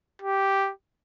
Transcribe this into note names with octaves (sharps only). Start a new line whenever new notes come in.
G4